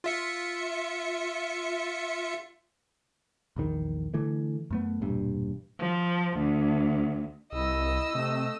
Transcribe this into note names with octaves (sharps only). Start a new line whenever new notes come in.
F4 E5 C#7
A#1 E2 D#3
D3 E3 A3
F#2 A3 B3
E1 G2 A#2
F3
D2
C2 E4 D#5 E6
C3 A3